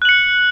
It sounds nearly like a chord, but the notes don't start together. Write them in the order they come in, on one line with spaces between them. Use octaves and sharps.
F#6 F#7 C#7